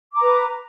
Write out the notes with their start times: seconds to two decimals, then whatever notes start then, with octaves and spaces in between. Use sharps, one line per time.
0.12 D6
0.17 A#5
0.21 B4